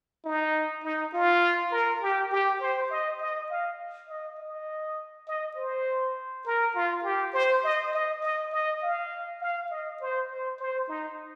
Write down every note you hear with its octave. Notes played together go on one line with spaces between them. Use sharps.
D#4
D#4
F4
A#4
G4
G4
C5
D#5
D#5
F5
D#5
D#5
D#5
C5
A#4
F4
G4
C5
D#5
D#5
D#5
D#5
F5
F5
D#5
C5
C5
C5
D#4